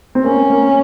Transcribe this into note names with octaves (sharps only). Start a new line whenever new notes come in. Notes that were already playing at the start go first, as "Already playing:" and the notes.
C4
A#3 C#4
A#3